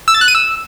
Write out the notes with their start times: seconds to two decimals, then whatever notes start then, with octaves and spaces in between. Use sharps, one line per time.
0.08 E6
0.14 A6
0.21 F#6
0.28 D#7
0.35 E6